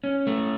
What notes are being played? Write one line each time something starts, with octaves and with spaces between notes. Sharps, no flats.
C#4
A3